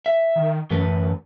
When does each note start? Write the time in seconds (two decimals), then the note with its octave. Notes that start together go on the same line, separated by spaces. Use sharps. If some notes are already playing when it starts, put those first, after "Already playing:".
0.06 E5
0.36 D#3
0.71 F#2 E3 A3 B4